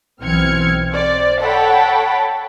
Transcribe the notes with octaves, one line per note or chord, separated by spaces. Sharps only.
B1 E3 C4 F6 G#6 C#7
C5 D5
A4 C#5 F#5 G5 A5 B5